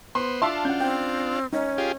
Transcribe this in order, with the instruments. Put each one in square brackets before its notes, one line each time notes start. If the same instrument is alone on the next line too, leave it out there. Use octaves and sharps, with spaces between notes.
[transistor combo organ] B3 C5 [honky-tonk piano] C6
[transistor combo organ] D4 F4 [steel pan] E5 D6 [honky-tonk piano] F5 A5 C6
[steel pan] C#4 F#5 [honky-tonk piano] G6
[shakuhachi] C4 [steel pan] G5
[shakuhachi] C#4 [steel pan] D#4
[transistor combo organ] F4 G4 G#4